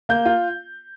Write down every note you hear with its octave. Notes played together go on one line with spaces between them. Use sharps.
A#3 G6
F4